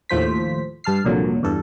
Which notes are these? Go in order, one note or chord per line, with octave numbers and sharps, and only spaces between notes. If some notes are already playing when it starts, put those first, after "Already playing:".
D#2 A2 F3 C5 B6
G2 A5 F6 C7
C2 F2 A#2 D3 F#3
E2 G2 A4